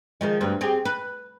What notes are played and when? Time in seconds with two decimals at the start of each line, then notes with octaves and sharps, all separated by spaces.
0.21 D#3 F3 G#3
0.41 D2 G2 C4
0.61 C4 G4 G#4
0.85 B4